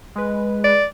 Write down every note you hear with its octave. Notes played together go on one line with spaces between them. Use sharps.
G#3 B4
D5